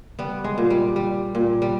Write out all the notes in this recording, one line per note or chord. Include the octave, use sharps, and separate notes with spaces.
G3 B3
G#3
A#2
G3
G3
A#2
G3